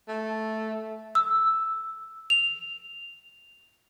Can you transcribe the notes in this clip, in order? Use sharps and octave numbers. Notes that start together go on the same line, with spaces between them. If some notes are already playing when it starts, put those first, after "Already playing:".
A3
E6
F7